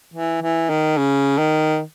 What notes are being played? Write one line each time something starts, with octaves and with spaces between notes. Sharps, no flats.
E3
E3
D#3
C#3
D#3